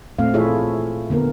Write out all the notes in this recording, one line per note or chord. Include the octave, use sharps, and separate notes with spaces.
A#2 A3 C4 F5
E4 F4 G#4 A4 C#5 E5
D3 A#3 B3 A#4